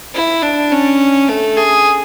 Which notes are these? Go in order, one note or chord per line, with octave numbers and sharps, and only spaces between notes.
E4
D4
C#4
A3
G#4